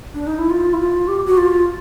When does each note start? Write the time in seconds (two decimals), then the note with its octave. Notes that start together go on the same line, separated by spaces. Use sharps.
0.14 D4
0.27 D#4
0.38 E4
0.50 F4
0.73 E4
0.80 F4
1.08 G4
1.27 F#4
1.37 F4